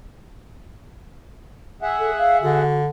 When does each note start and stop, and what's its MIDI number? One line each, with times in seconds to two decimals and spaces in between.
1.82 2.62 68
1.82 2.62 76
1.82 2.62 78
1.99 2.11 69
2.18 2.37 77
2.42 2.88 50
2.42 2.80 66